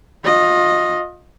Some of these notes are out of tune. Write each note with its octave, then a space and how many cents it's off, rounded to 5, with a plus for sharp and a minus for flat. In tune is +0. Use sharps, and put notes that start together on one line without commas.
F4 +30 D#5 +0